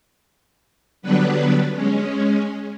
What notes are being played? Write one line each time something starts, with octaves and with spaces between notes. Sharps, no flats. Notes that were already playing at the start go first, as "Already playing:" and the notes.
D3 F#3 G3 B3 D4 B4
G#3 C#4